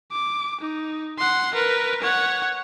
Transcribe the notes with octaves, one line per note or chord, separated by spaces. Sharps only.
D6
D#4
F#5 C6
A#4 B4
C#5 F#5